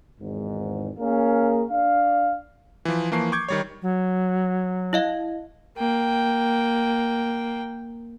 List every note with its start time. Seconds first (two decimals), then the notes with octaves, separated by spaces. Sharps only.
0.20 G#1 E2 G#2
0.99 A#3 C#4 G#4 A#4 F5
1.70 D4 D5 F5
2.85 E3 F3
3.12 E3 F3 A#3 A5 C#6 C7
3.32 C#6 D6 G6 G#6
3.48 D#3 G3 C#5
3.82 F#3
4.93 E4 D#5 F5
5.77 A#3 G5